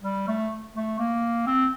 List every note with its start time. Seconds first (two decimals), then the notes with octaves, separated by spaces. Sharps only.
0.03 G3
0.28 A3
0.75 A3
0.99 A#3
1.46 C4